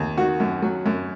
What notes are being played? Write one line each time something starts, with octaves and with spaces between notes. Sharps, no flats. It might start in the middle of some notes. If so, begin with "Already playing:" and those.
Already playing: D#2
D#3 F#4
F#2
F#3
F#2